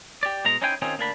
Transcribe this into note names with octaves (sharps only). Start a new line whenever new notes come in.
G4 D5
B2 G#3 A#5
C#4 D#4 E4 C5 G5 G#5
D#3 C4 C#4 D#4 F4 G#4
D2 A#3 D4 B5